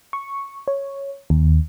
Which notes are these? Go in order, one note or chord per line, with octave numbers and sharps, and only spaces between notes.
C#6
C#5
D#2